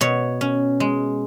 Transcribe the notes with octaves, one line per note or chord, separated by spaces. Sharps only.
B2 C#5
C#4
G#3